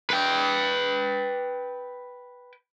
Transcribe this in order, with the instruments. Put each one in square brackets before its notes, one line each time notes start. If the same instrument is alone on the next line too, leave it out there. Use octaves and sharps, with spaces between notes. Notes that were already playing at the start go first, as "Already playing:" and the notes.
[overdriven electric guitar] B4 G5